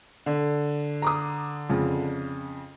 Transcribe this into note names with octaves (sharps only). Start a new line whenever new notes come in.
D3
A#5 D6 D#6
F2 C#3